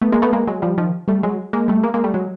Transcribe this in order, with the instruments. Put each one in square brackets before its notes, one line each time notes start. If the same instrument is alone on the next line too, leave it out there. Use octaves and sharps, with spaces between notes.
[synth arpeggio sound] A3 B3
G#3 A#3
A3 B3
G#3 A#3
F#3 G#3
F3 G3
D#3 F3
G3 A3
F#3 G#3
G#3 A#3
G3 A3
G#3 A#3
G#3 A#3
G3 A3
F#3 G#3